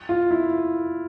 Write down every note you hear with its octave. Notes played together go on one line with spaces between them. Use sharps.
F4
E4